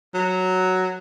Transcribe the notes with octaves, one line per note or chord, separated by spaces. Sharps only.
F#3